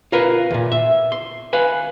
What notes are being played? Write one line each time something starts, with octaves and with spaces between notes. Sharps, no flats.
F4 A#4 B4 F5
D#2 A#2
E5
C6
B4 F5 G#5